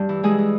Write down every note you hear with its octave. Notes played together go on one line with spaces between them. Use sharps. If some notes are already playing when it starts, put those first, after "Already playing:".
Already playing: G2 G3 G4
E3
E3 G#3 G#4
E3